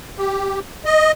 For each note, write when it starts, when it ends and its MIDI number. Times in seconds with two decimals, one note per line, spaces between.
0.18 0.59 67
0.85 1.12 75